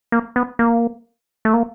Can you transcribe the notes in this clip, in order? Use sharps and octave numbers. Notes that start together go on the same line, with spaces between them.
A#3
B3
A#3
A3
A#3